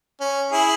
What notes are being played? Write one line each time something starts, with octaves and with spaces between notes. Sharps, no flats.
C#4
E4 G#4